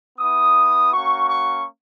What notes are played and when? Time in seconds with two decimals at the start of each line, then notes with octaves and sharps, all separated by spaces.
0.19 B3 E4 D#6
0.92 A#3 C#4 F#4 C#6
1.28 C#6